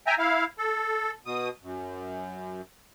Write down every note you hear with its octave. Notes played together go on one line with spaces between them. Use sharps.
E5 G5 G#5 A#5
E4 F5
A4
B2 D#6
F#2